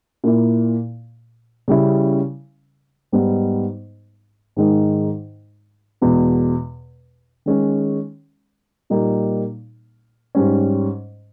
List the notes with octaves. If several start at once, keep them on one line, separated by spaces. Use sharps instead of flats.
A#2 A#3 E4
C#3 G3 C#4 E4
G#2 G3 B3 D#4
G#2 D#3 G#3 D#4
E2 B2 G#3
D#3 G#3 C#4
A#2 G3 A#3 D#4
G#2 G3 C#4